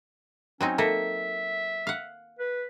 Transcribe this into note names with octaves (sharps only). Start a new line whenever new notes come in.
F#3 C4 C#4 D#4
A#3 D#4 A4 E5
F5 F#5
B4